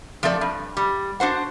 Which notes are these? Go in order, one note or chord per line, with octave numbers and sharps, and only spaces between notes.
F3 A3 C4 A4 D5
G2
G3
D4 F#4 C5 F#5